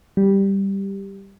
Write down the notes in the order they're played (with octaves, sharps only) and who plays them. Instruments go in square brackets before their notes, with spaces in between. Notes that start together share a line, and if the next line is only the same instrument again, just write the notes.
[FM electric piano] G3